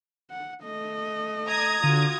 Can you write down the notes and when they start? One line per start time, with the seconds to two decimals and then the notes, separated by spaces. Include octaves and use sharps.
0.31 F#5
0.63 A3 D#5
1.47 A#5 D#6 G#6
1.84 D3 F4 F#4